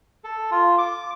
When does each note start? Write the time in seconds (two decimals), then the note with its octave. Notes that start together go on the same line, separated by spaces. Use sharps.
0.24 A4
0.51 F4
0.78 D6